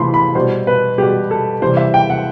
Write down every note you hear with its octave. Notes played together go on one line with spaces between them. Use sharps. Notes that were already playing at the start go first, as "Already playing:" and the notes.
Already playing: C3 E3 A3 B5 C6
B5
B2 G3 C5
B4
B2 G3 G4
A4
C3 E3 G3 C5
E5
G5
F#5